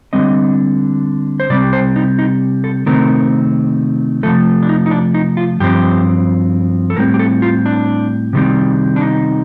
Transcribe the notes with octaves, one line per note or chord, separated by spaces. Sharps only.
D3 G3 C4 D#5
C5
C3 G3 C4 D5
C5
D#4
D#4
A4
C3 D#3 A3 C4 A#4
C3 F3 A3 A4
D4
D#4
D#4
D4
D#4
F4
G2 F3 C4 G4
A4
A2 G3 C4 A#4
G4
A4
F4
D4
C3 D#3 G3 C4
D4
D#4